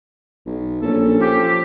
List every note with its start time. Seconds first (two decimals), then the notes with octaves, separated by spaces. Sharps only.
0.46 B1
0.82 A#1 C#4 A4
1.20 F3 G4